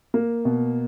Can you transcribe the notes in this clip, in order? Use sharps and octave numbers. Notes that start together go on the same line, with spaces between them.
A#3
B2